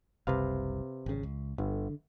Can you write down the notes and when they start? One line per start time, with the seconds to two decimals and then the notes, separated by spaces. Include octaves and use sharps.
0.27 F#1 C2 C3 B4 F5
1.06 G#1 C#3
1.23 C#2
1.58 G1 D3